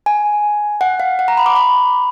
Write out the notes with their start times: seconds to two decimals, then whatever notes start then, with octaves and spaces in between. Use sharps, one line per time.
0.06 G#5
0.81 F#5
1.00 F5
1.19 F#5
1.28 A#5
1.37 B5
1.46 D6
1.56 B5